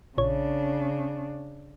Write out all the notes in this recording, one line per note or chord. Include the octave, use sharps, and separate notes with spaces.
A#1 C#3 D4 C#5